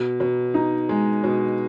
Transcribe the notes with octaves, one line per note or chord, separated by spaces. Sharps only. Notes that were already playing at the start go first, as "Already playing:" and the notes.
Already playing: B2
B2
D#4
G#3
B2